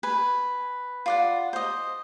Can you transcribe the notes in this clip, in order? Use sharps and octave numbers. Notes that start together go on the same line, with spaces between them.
B4 G#5
F4 D5 F#5
C5 D#5